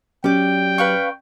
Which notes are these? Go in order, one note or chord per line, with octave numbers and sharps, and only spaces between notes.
F#3 C#4 G4 D5 G5
B4 F5 C#6